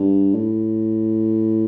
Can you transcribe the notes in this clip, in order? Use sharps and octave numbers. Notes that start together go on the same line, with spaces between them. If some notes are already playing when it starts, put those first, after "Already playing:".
Already playing: G2
A2